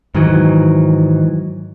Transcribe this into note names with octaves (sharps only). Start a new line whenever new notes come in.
G#2 D#3 E3 F#3